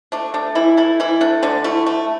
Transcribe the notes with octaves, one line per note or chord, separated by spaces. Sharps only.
A3 D4
A3 D4
E3 E4
A3 E4
E3 E4
A3 D4
D3 D4
A3 E4
A3